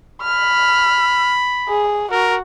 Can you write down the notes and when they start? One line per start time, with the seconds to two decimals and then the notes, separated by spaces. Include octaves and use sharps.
0.22 B5 F6
1.69 G#4
2.11 F#4 A#4